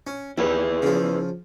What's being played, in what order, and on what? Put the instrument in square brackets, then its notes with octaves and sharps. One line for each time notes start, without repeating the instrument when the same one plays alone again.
[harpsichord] C#4
[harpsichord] D#2 [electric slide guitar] E4 G#4 B4
[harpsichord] C#3 F3